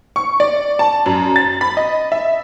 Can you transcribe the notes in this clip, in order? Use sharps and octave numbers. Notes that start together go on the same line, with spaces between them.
C#6
D5
A5
F#2
A6
B5
D#5
E5